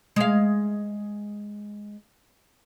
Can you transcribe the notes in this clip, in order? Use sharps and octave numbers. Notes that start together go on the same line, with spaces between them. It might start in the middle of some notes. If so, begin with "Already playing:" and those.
G#3 F5